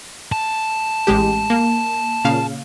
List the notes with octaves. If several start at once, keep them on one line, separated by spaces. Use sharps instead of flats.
A5
A1 G#3 G4
A#3
A#2 C#3 F5